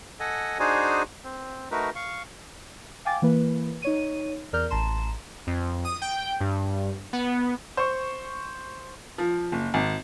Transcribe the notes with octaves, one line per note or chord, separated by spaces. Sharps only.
A4 D#5 F#5 G#5
D4 D#4 F#4 G#4 C5 G#5
C4
A3 D#4 F#4 A#4 B4
F5 C#6
F5 G5 G#5 D6 A6
E3 A#3 B4
D#4 C#5 D#7
E2 A#4 D5 F6 G6
A1 A5 A#5 C6 E7
F2
D#6
G5
G2
B3
C5 C#6
F3
F#1
G#1